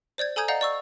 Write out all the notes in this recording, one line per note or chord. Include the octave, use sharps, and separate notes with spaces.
C5 D5 G6 G#6
A4 G#5 A#5 D#6 G6 G#6
D5 D#5 F5 F#5 A#5 G6
D5 C#6 E6